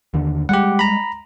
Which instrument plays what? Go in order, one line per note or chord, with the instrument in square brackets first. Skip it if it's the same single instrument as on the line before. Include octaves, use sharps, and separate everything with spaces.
[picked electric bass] D#2 D3
[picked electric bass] G3 G#3 [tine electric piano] G4 F#5
[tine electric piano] A#5 B5